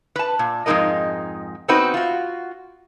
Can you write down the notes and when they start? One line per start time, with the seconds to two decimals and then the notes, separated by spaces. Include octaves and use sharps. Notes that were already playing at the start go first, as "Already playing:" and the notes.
0.16 B4 A5
0.39 A#2
0.66 F2 G#2 G#3 D#4 A#4 D#5
1.68 B3 C4 D#4 F#4 B4 C5
1.94 F4 F#4